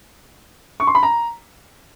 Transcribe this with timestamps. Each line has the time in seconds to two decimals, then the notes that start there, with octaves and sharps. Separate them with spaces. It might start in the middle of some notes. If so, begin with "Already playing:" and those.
0.80 C#6
0.87 C6
0.95 B5
1.03 A#5